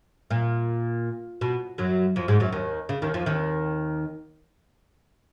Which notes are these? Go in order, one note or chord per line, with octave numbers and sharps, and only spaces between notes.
A#2
B2
F#2 F#3
F2 F3
G#2 G#3
F#2 F#3
D#2 D#3
C#3
D#2 D#3
F2 F3
D#2 D#3